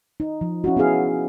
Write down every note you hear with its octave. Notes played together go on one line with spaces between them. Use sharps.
D#4
F3
C#4 E4 F#4
B3 C#4 E4 G#4 F5